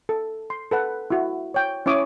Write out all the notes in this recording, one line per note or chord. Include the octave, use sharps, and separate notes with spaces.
A4
C6
A4 B4 F#5
E4 F#4
C#5 G5
C#4 E4 C#5 D6 D#6